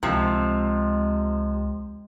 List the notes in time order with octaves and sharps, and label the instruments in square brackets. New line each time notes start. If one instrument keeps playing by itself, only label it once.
[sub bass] C#2 [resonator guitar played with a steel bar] C3 F3 [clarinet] G#3